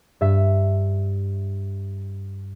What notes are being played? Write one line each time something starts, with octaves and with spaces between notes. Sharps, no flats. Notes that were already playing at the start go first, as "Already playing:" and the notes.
G2 E5 B6